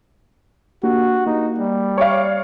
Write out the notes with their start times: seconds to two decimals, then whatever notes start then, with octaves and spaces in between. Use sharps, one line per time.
0.83 A#3 D4 F#4 G4
1.26 A#3 D#4
1.59 G3
1.98 C#5 D5 F5 C#6 D7